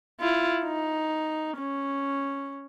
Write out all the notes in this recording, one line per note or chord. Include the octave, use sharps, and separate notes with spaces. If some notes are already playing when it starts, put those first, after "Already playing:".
E4 F4
D#4
C#4